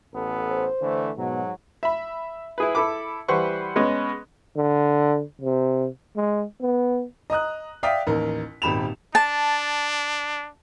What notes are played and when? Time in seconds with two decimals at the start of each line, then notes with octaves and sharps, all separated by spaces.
0.14 A1 B3 A4
0.50 C5
0.81 D3 E3 A3
1.18 G#2 B2 F#3
1.83 E5 B5
2.58 E4 G#4 B4
2.75 E4 A4 B5 D6
3.28 E3 G3 B4 C5 F#5 C#6
3.76 G#3 B3 C#4 D#5
4.56 D3
5.41 C3
6.16 G#3
6.61 B3
7.30 D#5 A#5 D#6 F#6
7.83 D5 E5 F5 G5 D#6 B6
8.07 A1 D#2 A#4
8.62 D#1 G#1 G4 B5 E7 F7
9.15 D4 A5